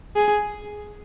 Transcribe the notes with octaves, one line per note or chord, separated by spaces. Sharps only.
G#4